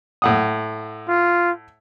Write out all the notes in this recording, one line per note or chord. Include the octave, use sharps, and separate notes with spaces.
A2 F#5 D#6
F4